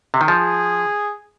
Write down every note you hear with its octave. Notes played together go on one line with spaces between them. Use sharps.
C3
D#3
F3 G#4